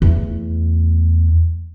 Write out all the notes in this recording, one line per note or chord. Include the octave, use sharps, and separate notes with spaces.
E2 A3